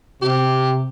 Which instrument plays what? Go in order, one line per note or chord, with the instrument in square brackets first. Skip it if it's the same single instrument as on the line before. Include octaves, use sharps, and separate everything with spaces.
[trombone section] C3 [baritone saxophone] G4